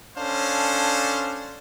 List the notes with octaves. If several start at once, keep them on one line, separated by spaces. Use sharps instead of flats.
C#4 D4 A4 C5 F5